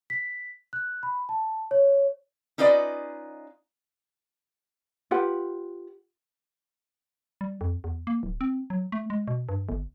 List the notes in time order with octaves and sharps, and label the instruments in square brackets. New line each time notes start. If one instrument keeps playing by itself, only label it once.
[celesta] B6
F#6
B5
A5
C#5
[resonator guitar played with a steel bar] C#4 D#4 F4 B4 D5 D#5
[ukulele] F4 G4 B4 F#5
[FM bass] G3
F2
E2
A#3
D1
C4
F#3
A3
G#3
B2
G2
G1